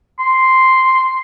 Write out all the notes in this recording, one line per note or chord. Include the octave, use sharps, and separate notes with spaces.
C6